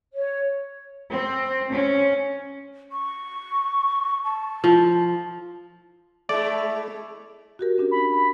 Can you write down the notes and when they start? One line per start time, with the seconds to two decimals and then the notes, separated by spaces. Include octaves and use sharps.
0.13 C#5
1.11 C4
1.73 C#4
2.92 C#6
4.24 A5
4.64 F3
6.29 G#3 A3 E4 D5
7.59 F#4 G4 A#4
7.78 C#4 D4 G4
7.91 B5
8.12 B5